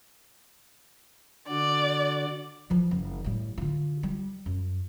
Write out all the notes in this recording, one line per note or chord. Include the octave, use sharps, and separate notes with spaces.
D3 F#4 D5
E3 F3
F#1
A2 G3
D3 F4
G3
F#2